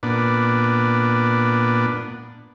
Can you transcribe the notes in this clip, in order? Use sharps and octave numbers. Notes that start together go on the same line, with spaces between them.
A#2 B3 D4